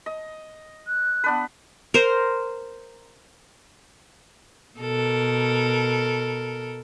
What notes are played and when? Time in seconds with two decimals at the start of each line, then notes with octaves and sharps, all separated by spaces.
0.06 D#5
0.87 F#6
1.24 B3 D4 B4
1.94 A#4 C5
4.79 B2 A4 A#4